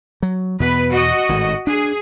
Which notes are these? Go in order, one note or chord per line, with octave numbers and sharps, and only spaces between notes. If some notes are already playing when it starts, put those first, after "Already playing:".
F#3
E2 B2 B3 B4
F#4 D#5
G#1 A2
D4 G#4